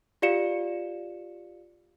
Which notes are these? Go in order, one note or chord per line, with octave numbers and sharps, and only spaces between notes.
F4 G4 D5 F5 C#7 E7